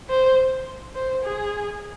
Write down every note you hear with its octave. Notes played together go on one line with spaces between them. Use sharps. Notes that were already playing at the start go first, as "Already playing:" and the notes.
C5
C5
G#4